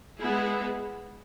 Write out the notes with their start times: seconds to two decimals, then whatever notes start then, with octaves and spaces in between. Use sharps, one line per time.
0.19 G#3 B3 E4 G#4